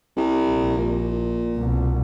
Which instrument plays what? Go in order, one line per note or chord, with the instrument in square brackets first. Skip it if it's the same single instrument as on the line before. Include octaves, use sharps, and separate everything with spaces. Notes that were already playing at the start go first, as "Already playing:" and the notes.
[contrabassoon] C2
[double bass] A#1
[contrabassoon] A#2
[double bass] C2 B2